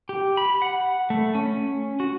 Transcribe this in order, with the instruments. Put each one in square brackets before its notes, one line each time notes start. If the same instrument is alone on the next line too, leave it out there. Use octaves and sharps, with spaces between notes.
[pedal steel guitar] G4
B5
F#5
A3
C#4
F#4